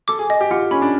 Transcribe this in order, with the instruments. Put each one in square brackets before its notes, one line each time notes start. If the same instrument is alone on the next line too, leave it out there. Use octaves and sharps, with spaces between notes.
[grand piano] A4 [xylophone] D6
[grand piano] G#4
[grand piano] G#4 [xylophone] D#5
[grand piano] G4
[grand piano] F4 [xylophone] F#5
[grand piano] C#4 [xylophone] B5
[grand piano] D4